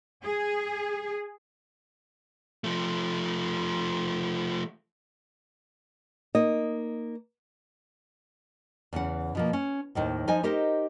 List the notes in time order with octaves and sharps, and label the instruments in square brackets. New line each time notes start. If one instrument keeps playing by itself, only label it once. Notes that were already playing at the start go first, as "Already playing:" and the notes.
[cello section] G#4
[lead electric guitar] F3 A3
[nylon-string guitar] A#3 D#4 D#5
E2 C#3 E3 F#5
B2 F3 A#3
C#4
D#2 A2 D#3 C5
F3 D#4 C5 D#5 G#5
D#4 G4 A#4 C5 D#5